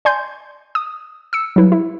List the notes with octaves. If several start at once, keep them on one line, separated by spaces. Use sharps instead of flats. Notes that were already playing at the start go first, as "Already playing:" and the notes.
D5 G#5 C6 G6
D#6
E6 C#7
F#3 G3 E4 B4
E4